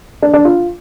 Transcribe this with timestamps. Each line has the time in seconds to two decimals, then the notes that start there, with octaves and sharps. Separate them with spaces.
0.22 D4
0.33 D4
0.45 F4